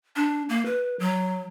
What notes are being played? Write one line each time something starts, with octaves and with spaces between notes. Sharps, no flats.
D4
A#3
B4
F#3